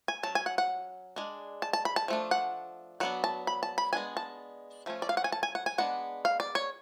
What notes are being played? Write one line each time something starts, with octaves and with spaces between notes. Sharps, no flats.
G#5
F#3 C#4 A5
G#5
F#5
F#5
G#3 D4
A5
A5
B5
A5
F3 A3 D4
F#5
F#3 B3 D4 F#5
A5
B5
A5
B5
G#3 B3 D4 G#5
A5
F3 A3 C#4
D5
F5
F#5
G#5
A5
G#5
F#5
G#5
G#3 B3 D4 F#5
F5
D5
C#5